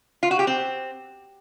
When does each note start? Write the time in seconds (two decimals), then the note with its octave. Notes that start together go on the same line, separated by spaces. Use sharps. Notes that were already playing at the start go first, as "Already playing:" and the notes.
0.23 F4
0.31 F#4
0.39 G4
0.47 C4